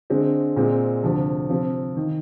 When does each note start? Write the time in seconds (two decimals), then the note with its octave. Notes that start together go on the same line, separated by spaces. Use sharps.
0.10 D3 G#3 C4
0.56 A#2 G#3 C4
1.03 D2 C3 F3
1.50 C3 F3 C4
1.97 D#3